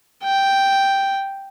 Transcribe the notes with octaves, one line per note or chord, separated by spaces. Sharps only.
G5